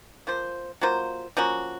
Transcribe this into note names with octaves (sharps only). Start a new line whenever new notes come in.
F3 A#3 F4 C5
F#3 A#3 F4 C5
F3 A#3 C#4 F#4